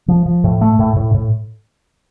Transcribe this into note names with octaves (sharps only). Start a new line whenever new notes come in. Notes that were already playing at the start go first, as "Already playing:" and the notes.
F3
F3
A2
A3
A2
A2
A2